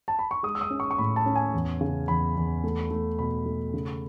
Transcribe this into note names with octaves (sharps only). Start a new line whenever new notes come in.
A5
B5
C#6
G#3 D#6
E6
D#6
C#4
C#6
C#6
A2 B5
A5
C#4
G#5
E2
C#3
E2 B5
E2
A3
A3
B2 B5
A3
C#3